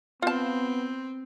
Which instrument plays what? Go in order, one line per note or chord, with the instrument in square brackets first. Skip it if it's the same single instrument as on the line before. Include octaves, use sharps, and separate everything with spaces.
[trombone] B3 [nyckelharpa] C4 [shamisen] F4 A5